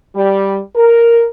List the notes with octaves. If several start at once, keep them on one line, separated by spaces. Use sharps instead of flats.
G3
A#4